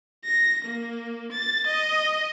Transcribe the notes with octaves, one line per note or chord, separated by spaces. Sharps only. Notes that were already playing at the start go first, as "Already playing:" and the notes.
A#6
A#3
A6
D#5